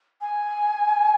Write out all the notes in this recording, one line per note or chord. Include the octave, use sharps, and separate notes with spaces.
G#5